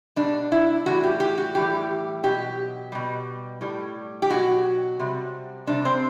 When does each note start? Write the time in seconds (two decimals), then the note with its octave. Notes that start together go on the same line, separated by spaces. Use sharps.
0.16 B2 G3 D4
0.52 E4
0.86 A2 E3 G3 F#4
1.04 G4
1.20 G4
1.38 F#4
1.55 A2 E3 G3 G4
2.23 B2 F#3 G4
2.92 B2 G3
3.61 A2 G3
4.22 G4
4.30 B2 F#3 F#4
4.99 C3 G3
5.67 C3 G3 D4
5.85 C4